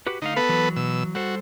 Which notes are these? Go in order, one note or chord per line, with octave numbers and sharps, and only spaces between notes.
F#4 G4 B4
D3 A3 D#4 F5
B3 A4 B4
E3 F#3
B2 E6
G3 F#4 A4 C5